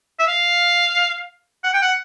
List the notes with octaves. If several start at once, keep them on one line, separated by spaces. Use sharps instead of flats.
E5
F5
F#5
G5
F#5